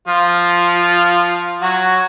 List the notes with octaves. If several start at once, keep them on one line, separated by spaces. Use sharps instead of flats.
F3 F4
F#3 F#4